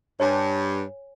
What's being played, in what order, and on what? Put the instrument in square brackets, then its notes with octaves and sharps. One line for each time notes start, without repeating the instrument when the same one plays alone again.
[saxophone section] G2 [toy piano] C#5 G#5